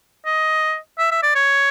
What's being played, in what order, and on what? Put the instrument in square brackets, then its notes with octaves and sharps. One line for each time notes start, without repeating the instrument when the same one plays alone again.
[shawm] D#5
E5
E5
D5
C#5